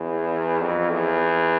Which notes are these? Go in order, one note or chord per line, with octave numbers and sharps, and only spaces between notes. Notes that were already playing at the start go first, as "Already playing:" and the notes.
Already playing: E2
F2
E2